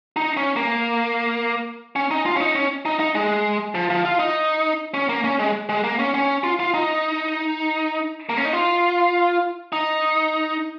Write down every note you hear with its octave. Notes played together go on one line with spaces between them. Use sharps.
D#4
C#4
A#3
C#4
D#4
F4
C#4
D#4
C#4
D#4
D#4
G#3
F3
F3
F4
D#4
C#4
A#3
C#4
G#3
G#3
A#3
C#4
C#4
F4
F4
D#4
A#3
C#4
D#4
F4
D#4